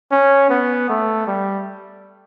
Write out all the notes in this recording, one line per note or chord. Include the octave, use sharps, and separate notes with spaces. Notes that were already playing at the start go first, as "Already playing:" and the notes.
C#4
B3
A3
G3